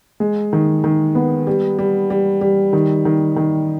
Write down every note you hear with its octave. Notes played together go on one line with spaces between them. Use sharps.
G#3
D#3
D#3
B3
G3
G3
G3
G3
D#3
D#3
D#3